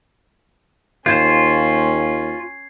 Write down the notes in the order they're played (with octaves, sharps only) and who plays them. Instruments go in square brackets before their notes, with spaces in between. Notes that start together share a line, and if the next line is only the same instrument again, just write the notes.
[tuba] D#2 [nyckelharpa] C#4 [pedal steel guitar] F4 C5 [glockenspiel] G6 G#6 C7